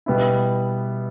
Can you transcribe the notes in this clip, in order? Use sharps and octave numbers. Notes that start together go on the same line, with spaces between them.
B2 G3 B3 E4